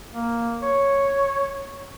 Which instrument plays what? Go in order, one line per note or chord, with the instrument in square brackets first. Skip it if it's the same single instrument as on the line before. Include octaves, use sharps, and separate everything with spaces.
[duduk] A#3
C#5